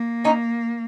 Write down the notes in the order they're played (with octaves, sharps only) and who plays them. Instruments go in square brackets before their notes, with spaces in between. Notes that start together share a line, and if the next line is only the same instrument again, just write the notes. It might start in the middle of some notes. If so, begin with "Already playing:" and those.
Already playing: [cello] A#3
[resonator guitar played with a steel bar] C#4 D#4